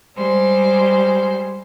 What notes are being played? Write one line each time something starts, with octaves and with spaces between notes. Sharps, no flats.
G3 G#3 C5